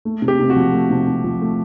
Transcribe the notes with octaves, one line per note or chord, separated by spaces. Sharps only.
A3
C3
G4
C3
F#4
F3
A3
C3
C3
F3
A3